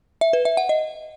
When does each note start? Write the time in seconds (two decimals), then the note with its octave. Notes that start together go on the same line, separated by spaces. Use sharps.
0.21 E5
0.33 B4
0.45 E5
0.57 F#5
0.69 D#5